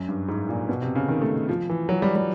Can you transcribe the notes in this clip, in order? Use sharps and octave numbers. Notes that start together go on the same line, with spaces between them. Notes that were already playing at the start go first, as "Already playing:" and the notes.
Already playing: F#2
G2
G#2
A#2
B2
C3
C#3
D#3
A3
F3
E3
F#3
G3
G3